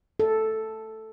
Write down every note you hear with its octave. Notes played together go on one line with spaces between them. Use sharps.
A4